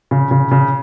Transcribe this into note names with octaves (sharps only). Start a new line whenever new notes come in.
C#3
C#3
C#3